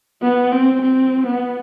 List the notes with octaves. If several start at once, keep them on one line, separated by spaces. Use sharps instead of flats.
B3
C4
C4
B3